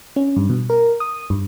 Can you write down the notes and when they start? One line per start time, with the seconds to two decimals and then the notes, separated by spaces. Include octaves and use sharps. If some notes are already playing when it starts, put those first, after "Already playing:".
0.16 C#4
0.36 G2
0.50 B2
0.70 A#4
1.00 D#6
1.30 G2